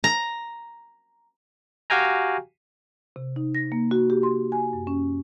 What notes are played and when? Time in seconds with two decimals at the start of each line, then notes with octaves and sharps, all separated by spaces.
0.04 A#5
1.90 F#4 G4 F5 G5 G#5 A#5
3.16 C3
3.36 D#4
3.55 A#6
3.72 A#3
3.91 F#4
4.10 G4
4.23 C6
4.52 G#5
4.73 F#2
4.87 C#4